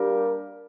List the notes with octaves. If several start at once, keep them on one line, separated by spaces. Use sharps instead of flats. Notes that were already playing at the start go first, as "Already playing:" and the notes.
Already playing: G3 A#3 D4 G4 A#4